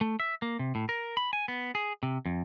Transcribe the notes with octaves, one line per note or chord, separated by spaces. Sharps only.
A3
E5
A#3
C3
A2
A#4
B5
G#5
B3
G#4
C3
F2